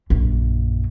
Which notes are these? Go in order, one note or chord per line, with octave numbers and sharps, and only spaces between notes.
A#1 F#2